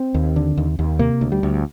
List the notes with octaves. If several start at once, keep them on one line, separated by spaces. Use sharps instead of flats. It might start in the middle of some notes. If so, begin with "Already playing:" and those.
Already playing: C4
D#2
D3
D#2
D#2
C3 A#3
D2
G3
D2